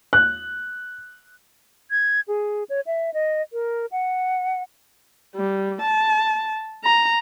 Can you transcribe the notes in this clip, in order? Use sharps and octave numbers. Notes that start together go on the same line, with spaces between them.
F#6
G#6
G#4
C#5
E5
D#5
A#4
F#5
G3
A5
A#5